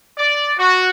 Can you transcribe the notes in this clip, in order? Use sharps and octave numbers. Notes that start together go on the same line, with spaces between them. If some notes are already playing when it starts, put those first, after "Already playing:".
D5
F#4